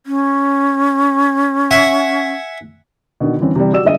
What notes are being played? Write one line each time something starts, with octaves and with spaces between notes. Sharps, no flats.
C#4
E5 F#5 G#5
B2 D3 D#3
G2 E3 C4 C#4
C3 E3 G3
F#4 G4 D5 E6 E7
G1 G#3 D4 D#5 E5 D#7